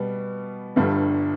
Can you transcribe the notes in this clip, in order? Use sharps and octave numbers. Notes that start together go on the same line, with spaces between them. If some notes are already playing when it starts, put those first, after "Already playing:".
Already playing: B2 G3 B3
G1 G2 D3 G3